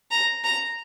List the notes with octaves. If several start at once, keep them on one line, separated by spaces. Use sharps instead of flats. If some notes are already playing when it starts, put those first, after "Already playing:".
A#5
A#5